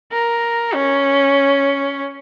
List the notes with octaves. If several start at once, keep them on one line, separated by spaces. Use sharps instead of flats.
A#4
C#4